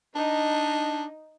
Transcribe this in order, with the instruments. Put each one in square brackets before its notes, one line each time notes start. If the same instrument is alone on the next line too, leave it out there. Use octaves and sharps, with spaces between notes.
[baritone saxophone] D4 [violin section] D#4